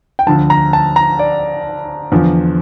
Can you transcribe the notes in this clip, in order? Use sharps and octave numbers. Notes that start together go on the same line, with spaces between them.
G5
D2 D3 F3 A5
A#5
A5
A#5
D5
E2 D3 F3